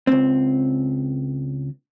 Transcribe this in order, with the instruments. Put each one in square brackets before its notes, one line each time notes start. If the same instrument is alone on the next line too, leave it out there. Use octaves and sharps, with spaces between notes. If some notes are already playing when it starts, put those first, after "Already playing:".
[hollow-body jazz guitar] C#2 C4